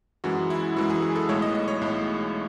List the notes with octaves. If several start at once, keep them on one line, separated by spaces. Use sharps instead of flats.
F#2 E3 G#3 F#4
E4
F#2 E3 G#3 F#4
G#4
G#4
A4
B1 A2 G#3 C#5
D#5
D#5
C#5
B1 A2 G#3